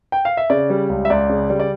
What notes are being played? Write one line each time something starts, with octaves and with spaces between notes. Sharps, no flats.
G5
F5
E5
C#3 D5
G3
C#2
E5
C#2 D5
C#3
G3
D5